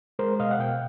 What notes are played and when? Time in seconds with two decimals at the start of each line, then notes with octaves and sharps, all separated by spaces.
0.19 G#3 A#4 C5
0.39 B2 D#5 F5
0.51 F#5
0.59 B2 F5 G5